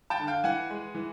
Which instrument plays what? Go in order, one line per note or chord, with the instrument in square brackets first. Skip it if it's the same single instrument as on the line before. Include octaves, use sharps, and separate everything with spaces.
[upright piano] G5 A5
D3
F5 G5
E3 F#5 G#5
G#3
E3